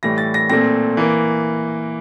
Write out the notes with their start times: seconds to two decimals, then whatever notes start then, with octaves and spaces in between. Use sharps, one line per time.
0.03 A2 E3 G3 A#6
0.18 A6
0.34 A#6
0.50 A#2 A3 C4 A#6
0.97 E3 A#3